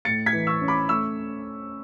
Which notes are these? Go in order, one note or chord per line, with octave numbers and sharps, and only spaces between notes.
A2 A6 C#7
G#6 B6
E3
C#6 E6
C#4
B5 D6
A3 C#6 E6